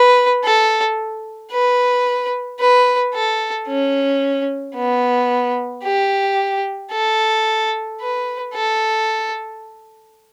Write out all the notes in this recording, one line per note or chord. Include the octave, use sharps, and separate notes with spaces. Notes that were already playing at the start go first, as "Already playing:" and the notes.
Already playing: B4
A4
B4
B4
A4
C#4
B3
G4
A4
B4
A4